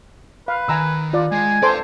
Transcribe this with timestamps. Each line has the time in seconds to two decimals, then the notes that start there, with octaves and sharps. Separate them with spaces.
0.48 B4 F5
0.69 D#3 G#5 A#5 E6
1.13 F4 D5
1.32 G#3 G#5
1.62 A4 B4 C5 D5 C6